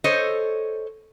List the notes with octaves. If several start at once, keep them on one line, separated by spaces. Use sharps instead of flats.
A4 C5 C#5 D#5